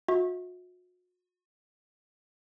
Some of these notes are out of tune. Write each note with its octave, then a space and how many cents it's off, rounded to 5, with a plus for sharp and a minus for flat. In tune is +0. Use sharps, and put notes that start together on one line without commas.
F#4 -40 E5 -30